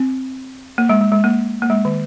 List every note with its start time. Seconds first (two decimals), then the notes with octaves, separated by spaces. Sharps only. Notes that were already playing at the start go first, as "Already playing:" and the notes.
Already playing: C4
0.78 A#3
0.89 G#3
1.01 G#3
1.12 G#3
1.24 A#3
1.62 A#3
1.70 G#3
1.85 D#3